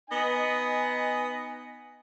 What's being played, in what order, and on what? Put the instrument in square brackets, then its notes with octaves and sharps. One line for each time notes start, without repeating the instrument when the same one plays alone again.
[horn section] B3 D#4 D#5 G#5